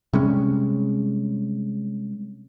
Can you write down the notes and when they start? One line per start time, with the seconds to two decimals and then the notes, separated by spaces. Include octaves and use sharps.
0.13 C3 G3 G#3 C#4